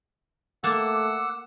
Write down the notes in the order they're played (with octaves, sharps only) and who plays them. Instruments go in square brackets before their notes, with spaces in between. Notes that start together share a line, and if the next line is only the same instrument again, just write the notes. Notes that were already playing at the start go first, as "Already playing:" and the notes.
[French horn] A3 [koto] A#3 A5 [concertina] F#5 E6 [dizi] D6